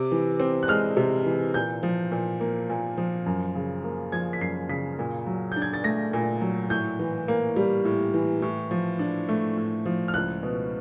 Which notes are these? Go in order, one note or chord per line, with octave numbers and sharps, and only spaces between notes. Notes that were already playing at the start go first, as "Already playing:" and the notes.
Already playing: C3 D6
E3
C4
F#6
G#3 F6
C3
E3
A#2 G6
F3
A#2
A#3
A#2
F3
F#2
C#3
A#3
F3 G#6
B6
F#2 C7
C#3 B6
A#2
F#3
D4 G6
G#6
A6
A3 A#6
A#2
F#3
A2 G6
E3
A#3
G3
A2
E3
A2
F3
D4
A3
A2
F3
F6
C#2 F#6
B2